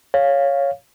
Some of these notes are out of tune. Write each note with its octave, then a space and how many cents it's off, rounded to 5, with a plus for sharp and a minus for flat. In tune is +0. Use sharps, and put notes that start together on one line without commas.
C#5 +0 F5 +0